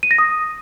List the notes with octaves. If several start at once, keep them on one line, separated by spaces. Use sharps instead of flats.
D#7
A#6
D#6